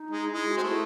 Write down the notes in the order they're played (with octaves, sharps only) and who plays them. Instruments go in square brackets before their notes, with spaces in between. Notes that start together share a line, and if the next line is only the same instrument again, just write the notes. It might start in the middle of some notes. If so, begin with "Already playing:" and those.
Already playing: [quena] D#4
[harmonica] G#3
[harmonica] G#3 [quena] E4
[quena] F#4
[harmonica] C4
[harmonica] A3 [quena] E4